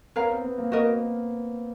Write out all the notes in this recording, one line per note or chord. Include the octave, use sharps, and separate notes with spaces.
B3 A#4 C#5 F5 A#5
C4
B3
A#3
A#3 F#4 A#4 D#5